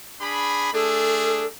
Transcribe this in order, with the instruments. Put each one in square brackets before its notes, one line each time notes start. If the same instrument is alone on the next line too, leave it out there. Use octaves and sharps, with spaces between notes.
[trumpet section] D4 G#4 B5
[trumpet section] A3 D4 G#4 [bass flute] A4